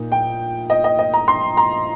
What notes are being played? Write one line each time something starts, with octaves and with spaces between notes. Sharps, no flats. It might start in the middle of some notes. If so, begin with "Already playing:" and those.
Already playing: A#2 A#3 D#4
G5
D#5
D#5
D#5
A#5
C6
A#5